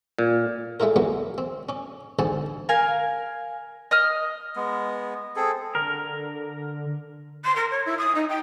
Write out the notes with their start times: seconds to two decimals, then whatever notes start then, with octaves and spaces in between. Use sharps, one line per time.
0.19 A#2
0.80 G#3 A3 E4 F4 A#4
0.96 F#3 G#3 A#3 B3 F4
1.38 C4
1.69 C#4 D6
2.19 D2 G#2 C4 F#5 G#5 A5
2.69 A#4 F5 G#5
3.91 D#5 D#6 F6
4.56 G#3 B3
5.36 C4 G#4 A4
5.75 D3 A#4
7.44 C6
7.55 A#4
7.70 C#5
7.85 E4
7.97 D#6
8.14 D#4
8.28 G5